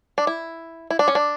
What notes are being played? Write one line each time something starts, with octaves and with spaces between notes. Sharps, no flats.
D4
E4
E4
D4
C#4
D4